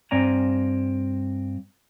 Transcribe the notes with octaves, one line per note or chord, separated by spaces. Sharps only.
G2 C4 D5 G#5 A#5